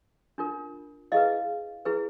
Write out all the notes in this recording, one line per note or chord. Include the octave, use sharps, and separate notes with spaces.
D4 F4 A#4
E4 G#4 B4 D#5 F5
E4 G#4 B4